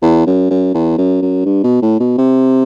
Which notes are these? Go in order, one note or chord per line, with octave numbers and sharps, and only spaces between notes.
E2
F#2
F#2
E2
F#2
F#2
G2
B2
A2
B2
C3